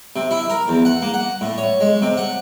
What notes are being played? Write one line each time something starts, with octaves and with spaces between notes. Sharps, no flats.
C3
E4
A#4
E2
F#5
A#3
F#5
A2
C#5
G#3
C3
F#5